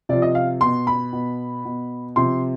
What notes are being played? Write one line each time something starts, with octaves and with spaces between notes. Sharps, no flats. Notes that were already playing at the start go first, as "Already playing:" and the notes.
C3 F3 D5
D#5
F5
B2 C6
B5
B2
B2
C3 F3 C6